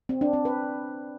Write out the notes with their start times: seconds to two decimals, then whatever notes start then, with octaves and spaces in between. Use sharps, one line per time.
0.09 C4
0.21 D4
0.33 C4
0.45 B4